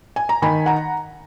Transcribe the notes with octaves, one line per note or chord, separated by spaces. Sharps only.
G#5
A#5
D#3 G#5 B5
F#5 A#5